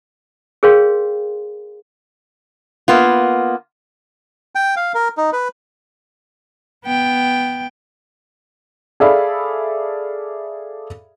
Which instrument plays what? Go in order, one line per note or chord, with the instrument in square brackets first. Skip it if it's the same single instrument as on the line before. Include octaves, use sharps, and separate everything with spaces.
[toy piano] G#4 A#4 C#5 F5 G5 C6
[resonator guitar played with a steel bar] A#3 B3 F4
[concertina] G5
F5
A#4
D#4
B4
[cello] B3 G5
[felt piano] G#4 A4 D5 E5 F5 B5